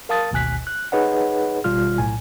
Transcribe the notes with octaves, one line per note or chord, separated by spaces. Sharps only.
A#4 F5 A5 D#6 A6
G#1 D2 B2 G#5 F#6 B6
F#6
D#4 G#4 B4 C#5 D#5 F#5
G#1 B2 G3 F4 F6
B1 A2 G#5